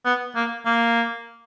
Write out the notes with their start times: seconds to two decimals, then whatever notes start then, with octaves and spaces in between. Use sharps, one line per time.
0.05 B3
0.36 A#3
0.66 A#3